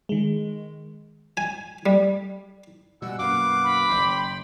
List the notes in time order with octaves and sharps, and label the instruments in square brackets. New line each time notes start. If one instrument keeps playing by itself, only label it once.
[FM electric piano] D#3 G#3
[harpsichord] G#5
G3
[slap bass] B2 G3 [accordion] G#3 F#5 E6
[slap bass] F#2 B2 A#3 [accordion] B4 F5 F#5 [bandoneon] D6
[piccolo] B5
[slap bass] F#1 D#3 [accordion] G5 C6